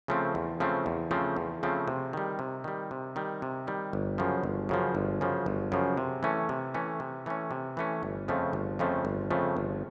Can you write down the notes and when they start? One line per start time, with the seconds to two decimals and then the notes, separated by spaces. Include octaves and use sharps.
0.08 C#3 F3 A3 C4
0.35 E2
0.60 C#3 F3 A3 C4
0.86 E2
1.11 C#3 F3 A3 C4
1.36 E2
1.63 C#3 F3 A3 C4
1.88 C3
2.13 D#3 G3
2.39 C3
2.64 D#3 G3
2.91 C3
3.16 D#3 G3
3.42 C3
3.67 D#3 G3
3.93 G1
4.18 F#2 C#3 F3
4.43 G1
4.69 F#2 C#3 F3
4.95 G1
5.21 F#2 C#3 F3
5.46 G1
5.72 F#2 C#3 F3
5.97 C3
6.23 E3 A3 C#4
6.49 C3
6.74 E3 A3 C#4
7.00 C3
7.26 E3 A3 C#4
7.51 C3
7.77 E3 A3 C#4
8.03 G1
8.28 F2 C#3 F3 A3
8.53 G1
8.79 F2 C#3 F3 A3
9.05 G1
9.31 F2 C#3 F3 A3
9.57 G1